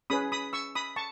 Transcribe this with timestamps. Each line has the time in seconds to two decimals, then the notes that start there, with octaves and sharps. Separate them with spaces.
0.10 C#4 G#4 B4 B5 D#6
0.32 B5 D#6
0.53 C#6 E6
0.75 B5 D#6
0.96 A5 C#6